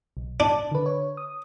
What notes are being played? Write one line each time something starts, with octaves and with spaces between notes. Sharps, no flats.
B1
D4 A5
D3 B4
C#5
D#6